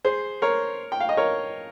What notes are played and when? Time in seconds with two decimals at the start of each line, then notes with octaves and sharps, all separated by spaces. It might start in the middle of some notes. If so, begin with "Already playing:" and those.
0.04 G#4 C5
0.42 A#4 C#5
0.92 G5
1.00 F5
1.09 D#5
1.17 A#4 C#5